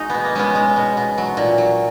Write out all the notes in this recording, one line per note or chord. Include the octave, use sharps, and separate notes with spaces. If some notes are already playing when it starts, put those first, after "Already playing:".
Already playing: G#3 D#4 F#4 G#4
B2 B3
A#3
G#3 B3 C#4
G#3 B3
B2
B2
F#3
A#2
F#3